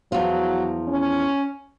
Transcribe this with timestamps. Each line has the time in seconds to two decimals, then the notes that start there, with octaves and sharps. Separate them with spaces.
0.12 E2 F3 F#3
0.88 C#4